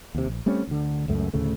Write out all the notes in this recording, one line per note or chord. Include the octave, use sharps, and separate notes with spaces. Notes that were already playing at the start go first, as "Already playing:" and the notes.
D#2 C3
A#1
G3 A3 C4 C#4
D2 D3
C#2 F#2 A3
D2 A2 C#3 A3